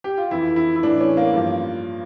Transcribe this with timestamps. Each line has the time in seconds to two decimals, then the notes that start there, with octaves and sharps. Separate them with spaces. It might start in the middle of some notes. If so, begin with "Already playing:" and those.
0.04 G4
0.18 F4
0.31 F2 E3 E4
0.56 E4
0.76 E4
0.83 A2 E3 D4
1.00 C#4
1.17 A#3
1.33 G2 F3